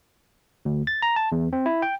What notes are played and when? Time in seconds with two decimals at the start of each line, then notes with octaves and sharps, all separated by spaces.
0.65 D2
0.87 A6
1.02 A#5
1.16 A5
1.32 E2
1.53 C4
1.66 E4
1.82 G5